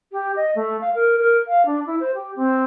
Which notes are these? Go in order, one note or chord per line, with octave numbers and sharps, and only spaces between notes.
G4
D#5
A3
F5
A#4
A#4
F5
D4
E4
C5
G4
C4